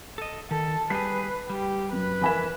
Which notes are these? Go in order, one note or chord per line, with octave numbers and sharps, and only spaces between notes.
A4 D#5
D#3 A4
G3 G4 G#4 B4 C7
G3 G4
F#2 B4
F2 E3 A#4 E5 G#5 B5